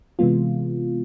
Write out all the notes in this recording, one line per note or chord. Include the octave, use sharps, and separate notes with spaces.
C3 E3 G#3 B3 F4